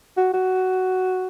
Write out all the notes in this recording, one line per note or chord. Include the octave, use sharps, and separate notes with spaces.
F#4
F#4